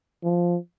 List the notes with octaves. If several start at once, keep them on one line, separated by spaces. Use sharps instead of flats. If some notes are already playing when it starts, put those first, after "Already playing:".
F3